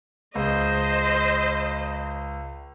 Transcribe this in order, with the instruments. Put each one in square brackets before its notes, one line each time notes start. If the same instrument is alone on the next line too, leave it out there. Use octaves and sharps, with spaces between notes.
[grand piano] C#2 [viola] C5 D#5